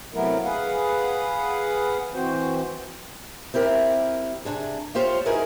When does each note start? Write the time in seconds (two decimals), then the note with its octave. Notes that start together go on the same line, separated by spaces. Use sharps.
0.14 C3 F#3 A3 B3 E4 A#4
0.44 G#4 B4 F5 F#5
2.14 E3 C4 F#4 C5
3.54 C4 E4 G4 A#4
4.45 C3 D4 G#4
4.95 F4 G4 C5 C#5 F5
5.26 D#4 E4 F#4 G#4 A#4 B4